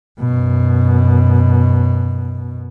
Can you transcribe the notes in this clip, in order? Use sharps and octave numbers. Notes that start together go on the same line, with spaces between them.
F#2 B2